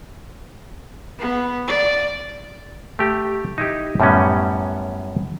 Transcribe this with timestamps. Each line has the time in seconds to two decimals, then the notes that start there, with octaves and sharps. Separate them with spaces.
1.19 B3
1.67 D5
2.99 A3 G4
3.58 D#4 E4 G4
4.00 F#2 A2 G3 B3 C#4